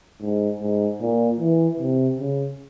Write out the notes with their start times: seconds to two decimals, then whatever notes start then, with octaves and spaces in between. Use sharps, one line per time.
0.21 G#2
0.60 G#2
1.01 A#2
1.40 E3
1.80 C3
2.20 C#3